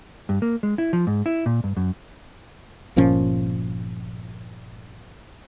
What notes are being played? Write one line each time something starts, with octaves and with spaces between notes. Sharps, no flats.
G2
A#3
G#3
E4
F3
G#2
E4
A#2
G2
F#2
G1 A#2 F3 C#4